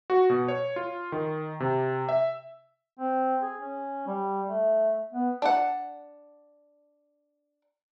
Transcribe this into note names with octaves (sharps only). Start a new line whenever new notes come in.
F#4
B2
C#5
F4
D#3
C3
E5
C4
G#4
C#4
G3
A3
B3
D4 F#5